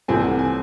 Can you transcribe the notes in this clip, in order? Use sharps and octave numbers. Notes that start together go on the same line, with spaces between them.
C2 C3 E3 A3 C4 G#5
F#5
G#5